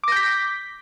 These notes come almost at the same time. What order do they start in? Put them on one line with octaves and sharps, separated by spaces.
D6 A#6 G6 B6